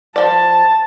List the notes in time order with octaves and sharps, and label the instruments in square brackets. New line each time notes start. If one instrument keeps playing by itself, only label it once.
[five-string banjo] F3 D5 [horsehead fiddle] A5